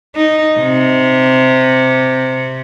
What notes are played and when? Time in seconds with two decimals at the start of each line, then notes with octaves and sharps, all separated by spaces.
0.16 D#4
0.60 C3